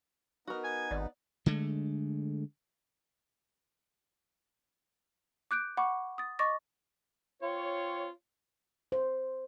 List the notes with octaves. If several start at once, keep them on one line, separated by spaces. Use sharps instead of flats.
B3 D#4 F#4 A#4
G#5
G#1 D5
D3 G#3 A3
D6 F#6 G6 D7
F#5 B5 C#6 D6
D#6 A6
D#5 C#6 D6 A6 A#6
C4 F4 C#5
C5